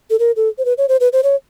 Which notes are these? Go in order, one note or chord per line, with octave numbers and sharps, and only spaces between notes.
A4
A#4
A4
C5
B4
C#5
C5
B4
C5
C#5